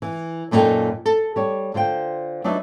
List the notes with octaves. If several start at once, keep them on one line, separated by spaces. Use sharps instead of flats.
E3
F#2 A#2 B3 D#4 A4 G5
A4
G3 C#5
D3 F4 C5 G5
F#3 D4 D#4 B4 D#5 E5